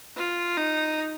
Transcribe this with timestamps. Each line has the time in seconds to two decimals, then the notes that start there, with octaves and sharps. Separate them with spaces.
0.17 F4
0.57 D#4